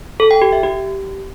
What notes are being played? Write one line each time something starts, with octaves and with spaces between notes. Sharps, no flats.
A4
G5
G4
E5
G4